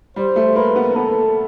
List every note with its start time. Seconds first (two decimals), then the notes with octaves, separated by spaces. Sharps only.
0.16 G3 C5
0.36 A3
0.56 A#3 B4
0.76 B3
0.96 B3 A4